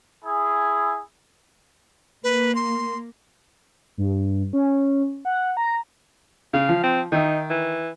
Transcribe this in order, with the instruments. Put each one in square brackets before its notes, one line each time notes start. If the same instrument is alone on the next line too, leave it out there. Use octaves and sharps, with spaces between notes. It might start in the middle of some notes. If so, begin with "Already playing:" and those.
[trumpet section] E4 G#4
[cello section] A#3 [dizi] B4
[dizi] C6
[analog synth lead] G2
C#4
F#5
A#5
[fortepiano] C#3 [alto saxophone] F5
[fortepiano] F3
[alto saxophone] C4
[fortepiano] D#3 E5 [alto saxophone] D#4
[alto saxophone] E3